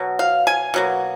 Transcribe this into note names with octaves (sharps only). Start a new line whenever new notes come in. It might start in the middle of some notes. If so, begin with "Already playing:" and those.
Already playing: B2 F#3
F5
G#5
B2 F#3 A#3